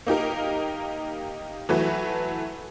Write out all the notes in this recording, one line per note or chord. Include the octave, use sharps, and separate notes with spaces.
A#3 D#4 G4 A#4
E3 F#3 A3 F#4 B4